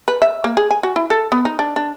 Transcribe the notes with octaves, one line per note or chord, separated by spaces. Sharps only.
B4
E5
A#3
G#4
G#5
F#4
E4
A4
B3
D#4
D4
D4